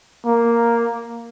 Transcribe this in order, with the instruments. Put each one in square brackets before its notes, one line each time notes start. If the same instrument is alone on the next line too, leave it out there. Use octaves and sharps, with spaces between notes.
[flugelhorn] A#3